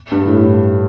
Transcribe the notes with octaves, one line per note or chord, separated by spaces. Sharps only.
G2
A2